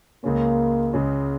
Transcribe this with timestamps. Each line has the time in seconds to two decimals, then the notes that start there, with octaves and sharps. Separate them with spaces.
0.24 C#2 C#3 G#3 A#3 C#4
0.93 C#2 C#3 G#3 C#4